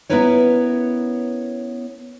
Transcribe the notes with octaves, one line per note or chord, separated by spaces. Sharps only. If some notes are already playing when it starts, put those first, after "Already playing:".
B3 C#4 E4 A#4 B4 C#5